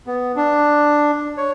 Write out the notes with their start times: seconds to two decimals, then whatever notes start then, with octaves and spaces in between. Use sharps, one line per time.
0.07 B3
0.36 D4
1.38 C#5